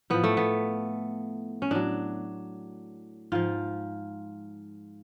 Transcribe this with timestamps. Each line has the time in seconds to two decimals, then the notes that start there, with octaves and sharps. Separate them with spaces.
0.10 A2 F3 B3
0.24 A3
0.37 B3
1.62 C#4
1.71 A2 F#3 D4
3.32 G#2 F3 F4